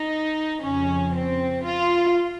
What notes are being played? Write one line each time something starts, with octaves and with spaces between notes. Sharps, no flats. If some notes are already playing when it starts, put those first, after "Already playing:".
Already playing: D#4
F2 C#3 C#4
C4
F4